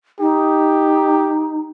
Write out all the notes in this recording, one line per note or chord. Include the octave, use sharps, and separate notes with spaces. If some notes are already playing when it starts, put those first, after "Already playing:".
D#4 G4